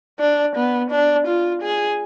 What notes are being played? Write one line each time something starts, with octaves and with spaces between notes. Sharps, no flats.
D4
B3
D4
F4
G#4